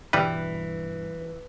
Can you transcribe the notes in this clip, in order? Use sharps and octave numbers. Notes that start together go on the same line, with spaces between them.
G2 B2 E3 G3 B4